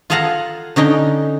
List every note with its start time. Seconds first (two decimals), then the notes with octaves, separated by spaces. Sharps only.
0.10 F4 G#4 A4 F5 F#5 A#5
0.76 D3 C#4 D#4 G5